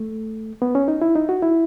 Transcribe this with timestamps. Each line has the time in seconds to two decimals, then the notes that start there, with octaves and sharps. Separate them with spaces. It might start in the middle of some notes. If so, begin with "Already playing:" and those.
Already playing: A3
0.62 B3
0.75 C#4
0.88 D#4
1.02 E4
1.16 D#4
1.29 F#4
1.42 E4